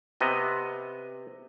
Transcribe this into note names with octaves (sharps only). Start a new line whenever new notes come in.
C3 B3 D#5